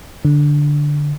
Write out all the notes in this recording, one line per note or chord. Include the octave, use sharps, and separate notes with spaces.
D3